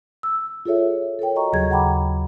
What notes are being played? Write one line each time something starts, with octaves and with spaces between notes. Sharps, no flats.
E6
F4 G#4 A4 C#5 E5
A4 A#4 C#5 G5
F#4 D#5 A#5 C#6
D#2 C#3 F#3 G#4 G#6
F#5 G5 A#5 B5 D6